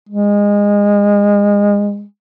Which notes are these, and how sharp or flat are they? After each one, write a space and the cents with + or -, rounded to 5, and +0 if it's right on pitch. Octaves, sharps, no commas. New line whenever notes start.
G#3 -25